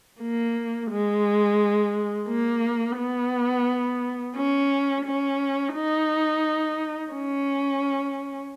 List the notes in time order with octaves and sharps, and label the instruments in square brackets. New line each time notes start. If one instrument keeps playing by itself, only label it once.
[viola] A#3
G#3
A#3
B3
C#4
C#4
D#4
C#4